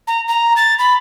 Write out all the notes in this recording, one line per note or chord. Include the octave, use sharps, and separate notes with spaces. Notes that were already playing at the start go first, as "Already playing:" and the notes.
A#5
A#5
A6
B5